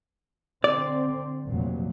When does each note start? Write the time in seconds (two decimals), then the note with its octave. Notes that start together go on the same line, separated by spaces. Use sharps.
0.64 D3 C4 D5
1.46 F1 A#2 F#3